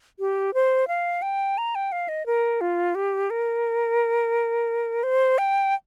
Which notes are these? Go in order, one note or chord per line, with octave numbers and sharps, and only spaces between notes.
G4
C5
F5
G5
A#5
G5
F5
D#5
A#4
F4
G4
A#4
C5
G5